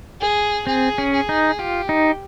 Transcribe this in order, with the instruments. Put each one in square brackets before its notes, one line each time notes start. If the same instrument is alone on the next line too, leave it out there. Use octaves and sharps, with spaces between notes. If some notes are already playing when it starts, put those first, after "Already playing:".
[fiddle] G#4
[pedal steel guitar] C4 [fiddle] G#4
[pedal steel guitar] C#4
[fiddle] G#4
[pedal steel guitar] D#4
[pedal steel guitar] F4 [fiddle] G4
[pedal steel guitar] D#4